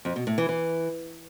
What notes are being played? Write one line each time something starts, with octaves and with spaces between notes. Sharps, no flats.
F2
B2
A2
E3
E3